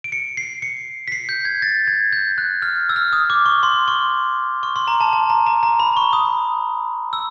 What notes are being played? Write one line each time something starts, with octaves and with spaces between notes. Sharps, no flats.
D7
C#7
C7
C#7
B6
C7
G6
G#6
A6
G#6
G6
F#6
F6
E6
F6
D#6
D6
C#6
C6
C#6
C#6
C6
A#5
A5
A5
A#5
A#5
A#5
B5
C#6
D#6
E6